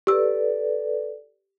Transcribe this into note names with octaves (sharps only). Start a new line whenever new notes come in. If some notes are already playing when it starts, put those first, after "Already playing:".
G4 A4 B4 D5 E6